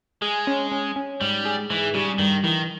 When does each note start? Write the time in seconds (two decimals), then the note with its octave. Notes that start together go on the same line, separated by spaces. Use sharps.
0.22 G#3 G#4
0.47 C#4
0.72 C#4
0.96 C#4
1.21 G#2 G3
1.45 G#4
1.70 G#2 E3
1.94 C#3 G3
2.19 G2 D#3
2.44 D#3 E3